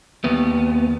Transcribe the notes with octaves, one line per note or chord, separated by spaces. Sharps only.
D#2 B3